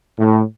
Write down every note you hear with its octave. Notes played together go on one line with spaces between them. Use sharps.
A2